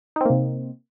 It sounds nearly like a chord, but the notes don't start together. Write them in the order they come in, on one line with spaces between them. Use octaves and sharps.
D#4 C4 A#3 C3